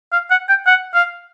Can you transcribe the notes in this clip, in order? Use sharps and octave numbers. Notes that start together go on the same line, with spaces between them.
F5
F#5
G5
F#5
F5